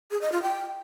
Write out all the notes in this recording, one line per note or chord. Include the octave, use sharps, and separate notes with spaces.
G#4
D#5
F4
G5